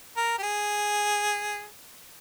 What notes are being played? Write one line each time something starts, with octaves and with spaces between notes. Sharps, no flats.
A#4
G4
G#4